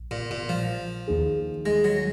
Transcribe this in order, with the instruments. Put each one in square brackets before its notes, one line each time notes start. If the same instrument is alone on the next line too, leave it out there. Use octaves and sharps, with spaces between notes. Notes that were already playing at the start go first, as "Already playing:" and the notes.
Already playing: [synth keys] A#1
[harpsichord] A#2
A#2
F3
[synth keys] D#2 D#3 A#3 D#4 G#4
[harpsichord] G#3
F#3